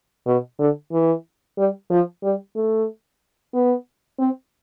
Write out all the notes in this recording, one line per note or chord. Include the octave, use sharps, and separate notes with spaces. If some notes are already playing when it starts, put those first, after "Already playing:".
B2
D3
E3
G3
F3
G3
A3
B3
C4